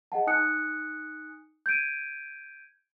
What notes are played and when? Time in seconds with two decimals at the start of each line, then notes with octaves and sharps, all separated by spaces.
0.12 G#4 D#5 F#5 A5
0.27 D#4 G#5 D#6 F#6 C#7
1.66 G6 G#6 D7 D#7